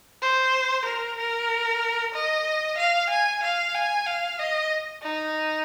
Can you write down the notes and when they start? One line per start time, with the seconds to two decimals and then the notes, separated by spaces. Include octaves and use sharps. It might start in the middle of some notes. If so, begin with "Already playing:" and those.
0.22 C5
0.85 A#4
1.18 A#4
2.14 D#5
2.77 F5
3.10 G#5
3.43 F5
3.74 G#5
4.06 F5
4.39 D#5
5.03 D#4